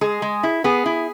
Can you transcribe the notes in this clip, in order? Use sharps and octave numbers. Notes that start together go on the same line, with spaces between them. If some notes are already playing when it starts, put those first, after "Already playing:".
G#3 G#4
G#3
E4
B3 G#4
E4